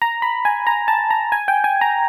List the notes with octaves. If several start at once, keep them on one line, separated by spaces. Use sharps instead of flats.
A#5
B5
G#5
A#5
A5
A#5
G#5
G5
G#5
A#5